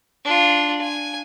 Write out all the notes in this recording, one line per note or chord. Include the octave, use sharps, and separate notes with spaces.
D4 F4
G#5